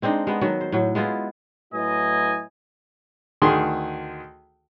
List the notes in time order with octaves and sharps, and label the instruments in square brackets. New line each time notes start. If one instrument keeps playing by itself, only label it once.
[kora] G#3 C4 D4 D#4
G#3 B3
D#3 F#3 F#4
C5
A2 F#3
G#3 B3 E4 F4
[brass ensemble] A2 F#3 E4 B4 D#5 G#5
[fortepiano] D2 D#3 G#4 C6